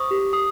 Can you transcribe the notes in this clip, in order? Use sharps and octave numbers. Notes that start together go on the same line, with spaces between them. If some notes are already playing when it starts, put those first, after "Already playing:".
Already playing: C5 C#6 D#6
G4
D#6